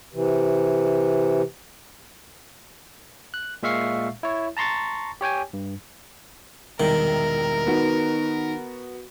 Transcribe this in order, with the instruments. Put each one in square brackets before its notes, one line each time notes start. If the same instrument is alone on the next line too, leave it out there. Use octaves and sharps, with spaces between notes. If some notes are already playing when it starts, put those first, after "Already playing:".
[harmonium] C3 E3
[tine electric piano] F#6
A#2 G#3 E5 F5 C#6 C7
E4 C#5
A5 A#5 C6 C#6 A6
G4 C#5 G5 G#5
G2
[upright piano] E1 C2 [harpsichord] D#3 [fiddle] A#4
[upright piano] B3 F#4 [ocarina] D#4